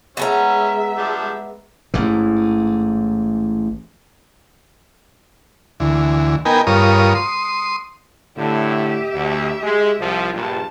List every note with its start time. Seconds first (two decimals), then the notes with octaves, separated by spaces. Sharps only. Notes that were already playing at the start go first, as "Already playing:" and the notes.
0.17 G#3 B3 C#4 G#4 E5 G#5 A#5
0.97 F3 G3 D4
1.94 A1 G#2 E3
5.80 D2 E3
6.45 B3 D#4 A#4 G5 G#5
6.67 G2 F4 A#4 C#5 D#6
7.15 C6 D#6
8.36 A2 D3 G4 E5
9.14 D2
9.63 G#3
9.99 C2 F3
10.33 A#1 G2 F4 A5